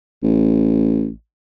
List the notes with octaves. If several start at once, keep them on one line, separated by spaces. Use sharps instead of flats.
A1